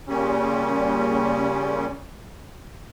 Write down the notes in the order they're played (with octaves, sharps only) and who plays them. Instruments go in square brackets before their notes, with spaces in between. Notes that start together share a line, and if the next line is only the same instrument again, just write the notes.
[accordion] A#2 C#3 G3 C#4